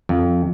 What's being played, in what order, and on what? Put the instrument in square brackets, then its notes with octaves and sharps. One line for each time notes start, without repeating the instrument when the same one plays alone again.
[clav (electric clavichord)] F2